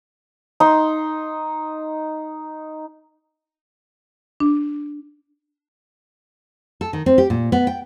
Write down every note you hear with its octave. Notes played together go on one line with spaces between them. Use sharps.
D#4 C6
D4
A4
D#3
C4
G4
A#2
B3
G5